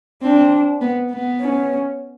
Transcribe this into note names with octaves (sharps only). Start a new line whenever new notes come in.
C4 D4
B3
B3
C#4